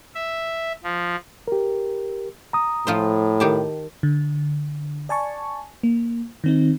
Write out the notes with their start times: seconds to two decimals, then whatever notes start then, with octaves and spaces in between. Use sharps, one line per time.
0.15 E5
0.84 F3
1.48 G4 A#4
2.53 A#5 D#6
2.87 A2 F3 F4 C5
3.40 D#3 G4 A5
4.03 D3
5.09 D5 G#5 A5 C#6
5.83 A#3
6.44 D#3 C4 D#4